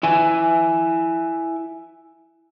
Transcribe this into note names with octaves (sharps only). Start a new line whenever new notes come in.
E4 E5 G#5